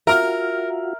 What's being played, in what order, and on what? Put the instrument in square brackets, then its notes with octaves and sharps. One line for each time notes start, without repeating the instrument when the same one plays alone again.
[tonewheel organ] F4 F#4 [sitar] A#4 [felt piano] E5 F6